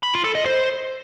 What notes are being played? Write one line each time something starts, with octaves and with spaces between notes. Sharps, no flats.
B5
F4
A4
D#5
C5